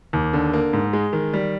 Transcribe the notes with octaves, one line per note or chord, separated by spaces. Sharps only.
D#2
D3
A#3
G#2
G#3
D#3
G3